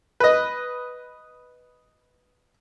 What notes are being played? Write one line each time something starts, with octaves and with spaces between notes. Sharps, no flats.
B4 D#5